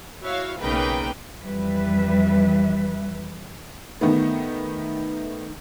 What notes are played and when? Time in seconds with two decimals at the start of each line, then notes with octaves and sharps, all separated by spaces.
0.22 E4 F#4 C#5 E5 F5
0.60 B1 C#3 A#3 D#4 B4 G5
1.41 F2 E3 G3 B4 E5
4.01 D#3 A3 B3